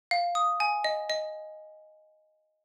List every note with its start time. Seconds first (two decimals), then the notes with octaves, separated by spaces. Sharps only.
0.11 F5
0.35 D#6
0.60 G#5
0.84 D#5
1.10 D#5